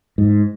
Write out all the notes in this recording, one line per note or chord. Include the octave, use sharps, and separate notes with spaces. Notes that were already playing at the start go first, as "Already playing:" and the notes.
G#2